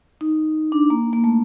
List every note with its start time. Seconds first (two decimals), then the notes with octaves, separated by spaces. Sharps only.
0.21 D#4
0.72 D4
0.90 A#3
1.13 A#3
1.24 A3